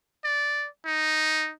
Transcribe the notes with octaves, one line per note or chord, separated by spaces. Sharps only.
D5
D#4